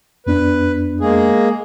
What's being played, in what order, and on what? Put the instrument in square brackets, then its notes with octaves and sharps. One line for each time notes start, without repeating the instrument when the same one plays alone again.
[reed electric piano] F2 B3 D4 [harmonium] B4
[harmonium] G#3 A#3 G#4